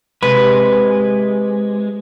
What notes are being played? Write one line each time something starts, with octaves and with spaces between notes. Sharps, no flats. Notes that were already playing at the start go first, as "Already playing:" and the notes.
C3 G#3 B4